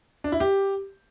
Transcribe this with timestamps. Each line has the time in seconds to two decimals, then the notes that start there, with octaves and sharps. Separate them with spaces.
0.24 D4
0.32 E4
0.40 G4